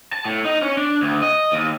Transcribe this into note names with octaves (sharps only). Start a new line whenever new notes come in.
A5
A2
D#4
C#4
D4
D2
D#5
D#2